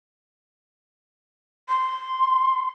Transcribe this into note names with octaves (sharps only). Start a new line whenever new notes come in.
C6